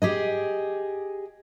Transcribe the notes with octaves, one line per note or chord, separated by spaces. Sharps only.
G4 G#4 D#5